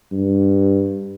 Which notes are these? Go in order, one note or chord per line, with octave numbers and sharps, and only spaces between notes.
G2